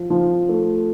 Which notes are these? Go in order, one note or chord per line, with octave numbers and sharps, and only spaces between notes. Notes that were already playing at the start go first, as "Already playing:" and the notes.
Already playing: F3
F3
A3